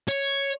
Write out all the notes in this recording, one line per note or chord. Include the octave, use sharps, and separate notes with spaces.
C#5